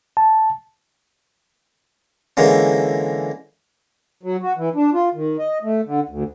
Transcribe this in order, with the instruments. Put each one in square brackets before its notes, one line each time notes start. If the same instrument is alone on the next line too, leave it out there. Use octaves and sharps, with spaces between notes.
[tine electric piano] A5
[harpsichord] D3 E3 G#3 A#3 C#4
[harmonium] F#3
F#4
E3
D4
F4
D#3
D#5
A3
D3
D2